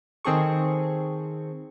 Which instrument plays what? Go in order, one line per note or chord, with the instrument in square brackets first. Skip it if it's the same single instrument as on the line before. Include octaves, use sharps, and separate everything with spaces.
[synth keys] D#3 C4 G#4 A4 C#6